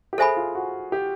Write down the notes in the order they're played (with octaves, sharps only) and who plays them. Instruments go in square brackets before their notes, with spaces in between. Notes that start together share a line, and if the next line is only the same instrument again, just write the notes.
[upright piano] G4
[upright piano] G#4 [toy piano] A4 C5 E5 G#5 B5
[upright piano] F4
F#4
G4